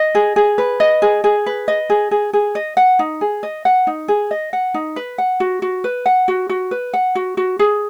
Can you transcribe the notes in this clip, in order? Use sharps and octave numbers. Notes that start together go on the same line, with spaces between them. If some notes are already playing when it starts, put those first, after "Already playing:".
Already playing: D#5
G#4
G#4
B4
D#5
G#4
G#4
B4
D#5
G#4
G#4
G#4
D#5
F#5
D#4
G#4
D#5
F#5
D#4
G#4
D#5
F#5
D#4
B4
F#5
F#4
F#4
B4
F#5
F#4
F#4
B4
F#5
F#4
F#4
G#4